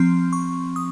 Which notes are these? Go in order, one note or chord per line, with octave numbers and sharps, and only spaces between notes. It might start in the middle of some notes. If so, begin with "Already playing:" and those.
Already playing: F3 C4 C6
C#6
D#6